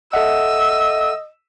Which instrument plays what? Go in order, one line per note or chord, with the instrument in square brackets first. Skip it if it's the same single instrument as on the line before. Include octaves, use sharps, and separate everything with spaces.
[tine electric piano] A4 E5 F#5 [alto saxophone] D#5 [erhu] E6